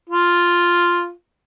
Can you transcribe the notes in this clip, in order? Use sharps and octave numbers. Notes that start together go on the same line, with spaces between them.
F4